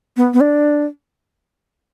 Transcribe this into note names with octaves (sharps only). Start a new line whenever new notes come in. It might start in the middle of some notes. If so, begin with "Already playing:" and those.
B3
B3
D4